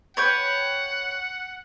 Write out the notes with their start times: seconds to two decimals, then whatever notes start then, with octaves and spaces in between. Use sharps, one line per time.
0.17 B4 C#5 F#5 G5